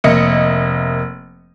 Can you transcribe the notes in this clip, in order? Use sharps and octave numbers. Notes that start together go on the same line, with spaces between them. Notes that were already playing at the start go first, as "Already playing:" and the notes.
F1 A#3 D#5 E5 C#7